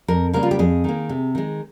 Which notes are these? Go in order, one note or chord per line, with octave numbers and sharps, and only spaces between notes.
F2 A#4
C#3 G3 A#3 A#4
F4
G4
F2 G#4
D#3 A#3
C3
D#3 G#3